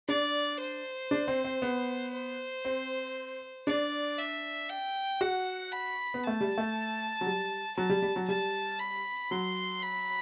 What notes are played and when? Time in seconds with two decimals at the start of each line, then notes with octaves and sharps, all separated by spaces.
0.09 D4 D5
0.60 C5
1.11 D4
1.28 C4
1.44 C4
1.62 B3
2.13 C5
2.65 C4
3.67 D4 D5
4.18 E5
4.70 G5
5.21 F#4 F#5
5.72 B5
6.14 B3
6.23 A3 A5
6.41 G3
6.58 A3
7.21 F#3
7.26 G3
7.77 F#3 A5
7.89 G3
8.02 G3
8.16 F#3
8.28 G3 A5
8.80 B5
9.31 F#3 C6
9.82 B5